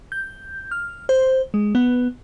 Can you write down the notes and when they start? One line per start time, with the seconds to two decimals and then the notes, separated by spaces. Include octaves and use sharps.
0.12 G6
0.71 F6
1.09 C5
1.54 G#3
1.75 B3